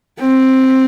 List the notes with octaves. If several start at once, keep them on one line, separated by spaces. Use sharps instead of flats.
C4